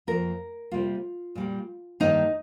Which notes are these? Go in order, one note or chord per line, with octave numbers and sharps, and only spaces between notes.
F2 F3 A#3 A#4
C3 G3 A#3 F4
A#2 G3 A#3
G2 D#3 A#3 D#4